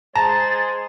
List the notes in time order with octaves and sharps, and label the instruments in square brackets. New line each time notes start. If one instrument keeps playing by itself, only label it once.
[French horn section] G#3 G#4 C5 [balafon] A5 [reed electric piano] A#5 [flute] A6